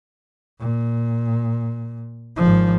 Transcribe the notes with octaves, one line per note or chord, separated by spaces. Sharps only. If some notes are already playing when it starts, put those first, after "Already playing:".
A#2
G#1 F3